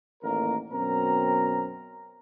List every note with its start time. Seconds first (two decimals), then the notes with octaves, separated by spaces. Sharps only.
0.23 A1 D#2 A#3 A#4
0.71 F#2 B2 C4 A#4 A#5